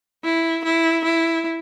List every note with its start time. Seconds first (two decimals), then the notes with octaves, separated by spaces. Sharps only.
0.24 E4
0.64 E4
1.04 E4